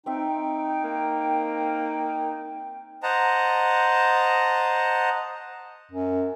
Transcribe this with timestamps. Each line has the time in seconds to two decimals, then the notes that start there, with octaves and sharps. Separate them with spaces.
0.06 C4 D#4 E5 G5
0.84 A#3
3.03 C5 D#5 F#5 A5 A#5
5.92 F#2